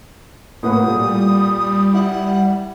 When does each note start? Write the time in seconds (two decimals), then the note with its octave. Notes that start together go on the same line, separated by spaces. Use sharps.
0.63 A2 A#3 B4 F#5 D#6
0.83 A#2 G3 A4
1.93 E4 F#5